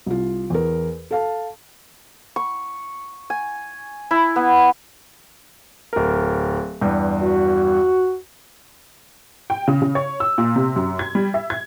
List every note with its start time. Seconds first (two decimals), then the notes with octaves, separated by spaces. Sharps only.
0.06 C2 F4
0.50 E2 A#4
1.11 A4 F5 A5
2.36 C#6
3.30 G#5
4.11 E4
4.36 B3
5.93 D1 A#4
6.81 E2 G2
7.23 F#4
9.50 G5
9.68 C#3
9.82 C#3
9.95 C#5
10.20 E6
10.38 A#2
10.56 C3
10.76 F#2
10.99 G#6
11.15 G3
11.34 E5
11.50 G#6